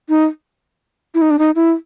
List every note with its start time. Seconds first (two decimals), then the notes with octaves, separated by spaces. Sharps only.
0.09 D#4
1.15 E4
1.22 D#4
1.31 D4
1.39 D#4
1.56 E4